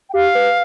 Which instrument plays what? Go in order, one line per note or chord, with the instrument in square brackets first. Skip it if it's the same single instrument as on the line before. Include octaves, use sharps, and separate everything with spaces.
[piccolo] G5
[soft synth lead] G4 [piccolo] F5
[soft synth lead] B4